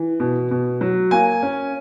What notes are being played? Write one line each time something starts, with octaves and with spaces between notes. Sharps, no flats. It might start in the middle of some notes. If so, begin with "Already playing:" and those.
Already playing: E3
B2
B2
F#3
A#3 G#5
C#4